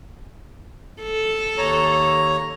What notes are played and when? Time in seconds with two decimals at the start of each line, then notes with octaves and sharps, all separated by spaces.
1.02 A4
1.58 D#2 C#5 A#5